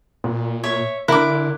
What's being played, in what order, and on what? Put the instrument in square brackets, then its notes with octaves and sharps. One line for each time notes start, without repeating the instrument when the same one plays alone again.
[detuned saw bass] A#2
[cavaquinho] C#5 E5
[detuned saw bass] D3 [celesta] D4 F#6 [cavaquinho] E4 D6 [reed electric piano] A#4